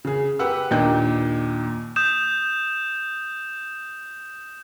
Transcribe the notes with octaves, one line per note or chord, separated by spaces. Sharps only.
C#3 G#4
G4 B4 F#5 E6
D#2 A#2 D4 D#4 G5 G6
D#6 G6 E7